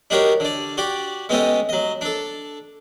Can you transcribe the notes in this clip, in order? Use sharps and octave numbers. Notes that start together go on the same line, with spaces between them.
D4 D#4 F#4 G4 A#4 C#5
D3 D5
F#4 G4 D5
G#3 B3 C#4 G4 A4 D#5
F#3 D#5
D4 A4